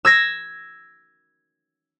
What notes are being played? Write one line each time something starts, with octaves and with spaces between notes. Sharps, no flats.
E6 G#6 A#6